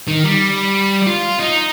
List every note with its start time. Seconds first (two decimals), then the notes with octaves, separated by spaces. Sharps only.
0.08 D#3
0.24 G3
1.07 F4
1.40 D#4